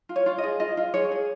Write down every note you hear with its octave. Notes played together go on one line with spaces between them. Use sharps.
F4
C#5
F4
D#5
G#4
F4 D#5
F4
G#4 C#5
G#4